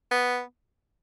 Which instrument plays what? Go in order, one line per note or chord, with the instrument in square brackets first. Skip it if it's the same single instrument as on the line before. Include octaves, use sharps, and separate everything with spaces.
[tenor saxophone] B3